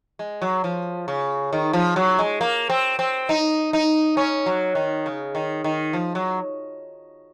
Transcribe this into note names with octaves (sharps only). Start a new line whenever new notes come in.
G#3
F#3
F3
C#3
D#3
F3
F#3
G#3
A#3
C4
C4
D#4
D#4
C#4
F#3
D#3
C#3
D#3
D#3
F3
F#3